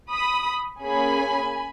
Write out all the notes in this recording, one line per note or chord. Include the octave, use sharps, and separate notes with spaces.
B5 D#6
A#3 C#4 G#4 G#5 B5